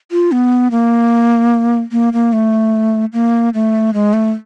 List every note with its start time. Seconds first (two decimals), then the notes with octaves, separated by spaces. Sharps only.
0.12 F4
0.32 B3
0.71 A#3
1.92 A#3
2.13 A#3
2.33 A3
3.13 A#3
3.54 A3
3.94 G#3
4.13 A3